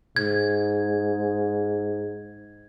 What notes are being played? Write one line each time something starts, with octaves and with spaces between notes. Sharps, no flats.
G#2 G#6